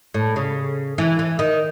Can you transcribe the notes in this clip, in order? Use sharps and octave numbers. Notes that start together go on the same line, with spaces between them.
A2
C#3
E3
E3
D#3